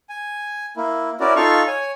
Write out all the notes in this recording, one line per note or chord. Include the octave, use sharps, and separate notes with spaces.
G#5
A#3 E4
C#4 E4 F#4 A#4 D5
D#4 F4 A4 F5 C#6
C#5 G#5